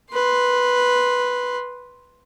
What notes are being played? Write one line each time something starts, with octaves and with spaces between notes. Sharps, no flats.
B4 C6